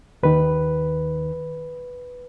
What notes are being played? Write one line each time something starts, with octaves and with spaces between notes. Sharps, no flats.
D#2 D#3 B4